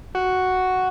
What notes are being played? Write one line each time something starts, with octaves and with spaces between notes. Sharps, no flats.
F#4